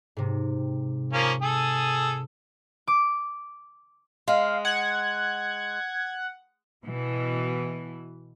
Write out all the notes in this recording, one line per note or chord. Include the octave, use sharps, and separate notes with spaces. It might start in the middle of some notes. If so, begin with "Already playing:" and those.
G#2 C3
F3 A#3 C#4
G#4 A4 D#6
D6
G#3 F5
F#5 G#6
B2 E3